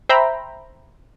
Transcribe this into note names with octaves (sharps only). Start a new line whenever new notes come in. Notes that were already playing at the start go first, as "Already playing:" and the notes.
C5 E5 G5 A#5 B5